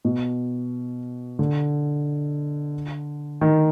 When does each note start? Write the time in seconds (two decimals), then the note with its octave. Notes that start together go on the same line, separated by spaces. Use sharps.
0.05 B2
1.39 D3
3.41 D#3